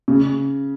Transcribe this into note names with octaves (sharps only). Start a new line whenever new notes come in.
C#3